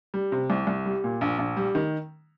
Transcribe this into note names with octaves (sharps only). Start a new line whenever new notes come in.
G3
C3
C2
C2
G3
A#2
A#1
A#1
G3
D#3